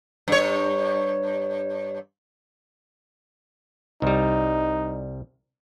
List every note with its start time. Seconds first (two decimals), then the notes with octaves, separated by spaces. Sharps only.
0.28 G2 C#5
4.02 C2 G3 D#4